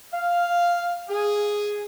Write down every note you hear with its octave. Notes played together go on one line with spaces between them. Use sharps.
F5
G#4